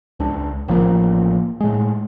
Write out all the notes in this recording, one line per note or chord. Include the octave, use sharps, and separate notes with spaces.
C#2 D4
A1 F3 G3 A#3
A2 G#3